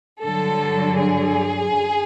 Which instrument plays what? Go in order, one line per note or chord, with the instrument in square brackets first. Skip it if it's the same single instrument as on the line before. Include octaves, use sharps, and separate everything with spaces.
[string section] G2 D3 F#3 A4
G#4
F#2